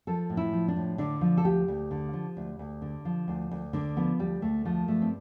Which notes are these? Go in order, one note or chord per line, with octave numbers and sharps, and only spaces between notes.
F3 A4
A2
E4
F3
D4
A2
D3 D4
F3
A4
D2 G4
D2
D3
F3
D2
D2
D3
F3
D2
D2
D3 D4
F3 B3
D2 G3
D2 A3
F3 A3
G2 A3
C4